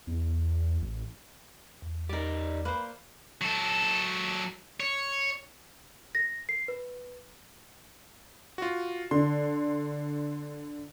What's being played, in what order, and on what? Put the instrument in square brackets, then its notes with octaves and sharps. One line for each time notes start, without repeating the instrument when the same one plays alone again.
[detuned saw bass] E2
A1
[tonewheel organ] E2
[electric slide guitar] G3 D#4 [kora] A#4 D5
[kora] A#3 C5 [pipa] B4
[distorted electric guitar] F#3 A4
C#5
[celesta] A#6
C7
B4
[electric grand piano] F4 F#4
[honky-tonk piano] D3 [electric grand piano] C6